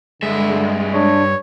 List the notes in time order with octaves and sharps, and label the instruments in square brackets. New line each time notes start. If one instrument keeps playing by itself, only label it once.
[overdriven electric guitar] G2 E5 [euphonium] D3 [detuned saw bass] G#3
[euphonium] D4 [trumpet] C#5